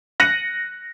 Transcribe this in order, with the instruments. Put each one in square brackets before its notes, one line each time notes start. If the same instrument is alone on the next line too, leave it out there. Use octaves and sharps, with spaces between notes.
[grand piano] F#6 A#6 C#7 D#7 F#7